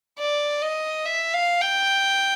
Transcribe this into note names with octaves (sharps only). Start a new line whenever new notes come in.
D5
D#5
E5
F5
G5